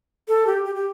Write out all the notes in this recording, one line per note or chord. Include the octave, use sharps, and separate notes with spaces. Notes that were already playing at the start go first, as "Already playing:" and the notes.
A4
G4
G4
G4